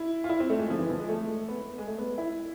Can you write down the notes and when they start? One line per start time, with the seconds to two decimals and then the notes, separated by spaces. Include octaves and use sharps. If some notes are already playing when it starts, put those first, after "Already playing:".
Already playing: E4
0.24 F4
0.29 E4
0.40 C4
0.50 A3
0.59 G#3
0.70 F3
0.79 E3
0.90 F3
1.00 G#3
1.09 A3
1.48 B3
1.59 B3
1.78 G#3
1.88 A3
1.98 B3
2.18 E4